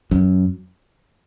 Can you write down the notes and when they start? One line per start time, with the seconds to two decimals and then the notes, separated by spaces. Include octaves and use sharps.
0.11 F#2